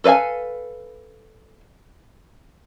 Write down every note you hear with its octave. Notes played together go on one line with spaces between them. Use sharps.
A4 B4 D5 F5 G#5